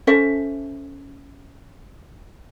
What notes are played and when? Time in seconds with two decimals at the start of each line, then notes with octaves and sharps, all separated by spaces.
0.07 C#4 A4 C5 E5